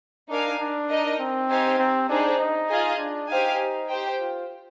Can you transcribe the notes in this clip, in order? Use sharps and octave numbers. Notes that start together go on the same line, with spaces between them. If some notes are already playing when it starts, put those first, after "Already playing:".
D4 D#4 A#4 F5 G#5
D4
D#4 A#4 D#5
C4
D#4 G4 C5 F5 G#5
C4
D4 D#4 G#4 C5
D#4
F4 G#4 D#5 G#5
D4
D#4 G4 C5 F5 G#5
G4 C5 G5
F4